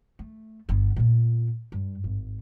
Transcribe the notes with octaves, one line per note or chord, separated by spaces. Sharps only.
A3
G1 B3
A#2 B3
G2
G#1